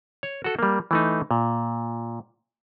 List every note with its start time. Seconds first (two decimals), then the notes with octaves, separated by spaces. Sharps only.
0.23 C#5
0.44 F#4 A4
0.59 G3 A#3
0.91 E3 A3 D#4
1.31 A#2